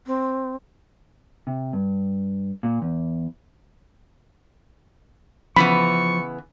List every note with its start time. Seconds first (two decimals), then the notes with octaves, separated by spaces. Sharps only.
0.07 C4
1.47 C3
1.73 G2
2.63 A#2
2.82 E2
5.56 C#3 E3 F3 B3 B5 C#6